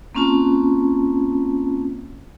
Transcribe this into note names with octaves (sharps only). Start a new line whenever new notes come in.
A#3 C4 C#4 F4 A5